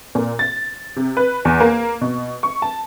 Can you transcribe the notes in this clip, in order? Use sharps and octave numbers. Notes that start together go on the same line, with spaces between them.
A#2
A6
C3
B4
E2
A#3
B2
C#6
A5